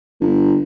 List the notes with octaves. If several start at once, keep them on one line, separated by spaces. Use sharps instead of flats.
G1